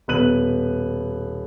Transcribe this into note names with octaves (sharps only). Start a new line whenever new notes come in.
D#1 B2 B3 F#6 D#7 F#7